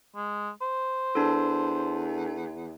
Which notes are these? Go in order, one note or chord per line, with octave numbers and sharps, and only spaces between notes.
G#3
C5
E2 D4 A4